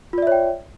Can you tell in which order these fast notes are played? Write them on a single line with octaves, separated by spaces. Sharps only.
F4 D5 E5 C#5 G5